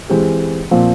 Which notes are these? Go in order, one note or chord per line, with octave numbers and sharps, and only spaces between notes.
E3 G#3 C4 G4
A#2 F3 C4